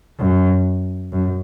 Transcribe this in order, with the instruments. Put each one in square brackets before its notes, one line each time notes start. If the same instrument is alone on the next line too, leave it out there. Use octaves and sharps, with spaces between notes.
[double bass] F#2
F#2